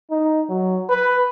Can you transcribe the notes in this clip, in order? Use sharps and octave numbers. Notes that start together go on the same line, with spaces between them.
D#4
F#3
B4